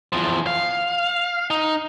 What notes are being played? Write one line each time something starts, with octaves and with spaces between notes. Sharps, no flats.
E2 F3
F5
D#4